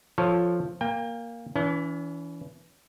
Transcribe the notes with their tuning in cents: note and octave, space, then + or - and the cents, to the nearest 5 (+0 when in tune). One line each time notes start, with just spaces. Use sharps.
F3 +0 A4 +0 C#5 +0
A#3 +0 G5 +35
E3 +0 C#4 +40